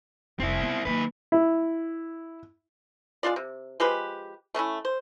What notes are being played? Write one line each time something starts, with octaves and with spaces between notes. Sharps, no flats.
F1 G3 C4 E4
B3 F4
D#3 F#3 A#3 B4
E4
G#3 D4 F4 D5
C3
F3 G#3 G4 B4
A3 C#4 D4 E4
C5